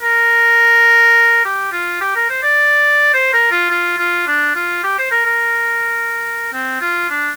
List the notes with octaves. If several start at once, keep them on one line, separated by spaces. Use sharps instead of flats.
A#4
G4
F4
G4
A#4
C5
D5
C5
A#4
F4
F4
F4
D4
F4
G4
C5
A#4
A#4
C4
F4
D4